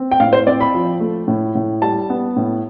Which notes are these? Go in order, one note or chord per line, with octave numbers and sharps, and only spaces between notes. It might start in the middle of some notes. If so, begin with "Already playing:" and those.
Already playing: C4
G5
A2 F5
C5
C4 D5
B5
F3
A3
A2
A2
G3 A5
B3
A2